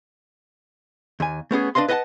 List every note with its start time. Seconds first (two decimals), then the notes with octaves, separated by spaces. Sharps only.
1.20 D#2 G#5
1.51 A3 B3 C#4 G#4
1.75 D4 B4 D#5 F5 C6
1.88 B4 D#5 F#5 G#5 A5